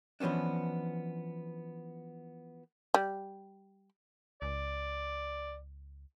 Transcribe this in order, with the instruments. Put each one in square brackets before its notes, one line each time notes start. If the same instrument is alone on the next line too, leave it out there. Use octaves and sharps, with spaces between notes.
[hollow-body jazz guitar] E3 F3 B3 C#4 D4
[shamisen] G3
[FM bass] C#2 [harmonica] D5